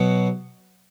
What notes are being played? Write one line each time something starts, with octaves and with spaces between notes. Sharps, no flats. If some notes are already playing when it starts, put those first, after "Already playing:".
Already playing: B2 F#3 B3 F#4